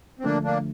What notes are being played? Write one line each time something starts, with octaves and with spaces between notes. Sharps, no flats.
C4
D3 F3 A3 A#3 D4
A#3 D4